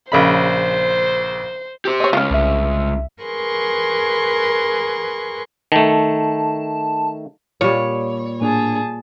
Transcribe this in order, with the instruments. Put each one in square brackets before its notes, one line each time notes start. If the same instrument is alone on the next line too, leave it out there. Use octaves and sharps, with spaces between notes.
[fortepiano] A#1 C#3 B5 [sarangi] C5
[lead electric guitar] G4 C5
[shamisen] C#5 D#5
[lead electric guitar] C#2 [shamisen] C#4 F4
[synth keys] C2 E5
[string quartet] G#4 A#4 B4 C6 C#6
[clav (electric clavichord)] D#3 A3 [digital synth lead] A5
[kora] A#2 G3 [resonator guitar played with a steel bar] C#5
[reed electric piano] A2 A#3 D4 [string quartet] G#4 A5